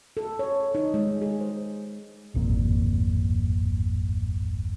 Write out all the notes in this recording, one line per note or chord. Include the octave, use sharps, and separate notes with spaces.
A4
C#5
D#4
G#3
G#4
C5
D1 G#1 F2 A#2